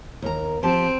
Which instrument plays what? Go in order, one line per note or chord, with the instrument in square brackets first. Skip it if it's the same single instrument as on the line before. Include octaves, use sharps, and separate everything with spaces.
[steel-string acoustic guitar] D#2 A#4 A#5
[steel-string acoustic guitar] F3 G4 A5 [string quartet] C4